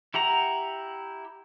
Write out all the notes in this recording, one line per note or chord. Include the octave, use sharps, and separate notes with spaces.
E4 G4 F#5 A#5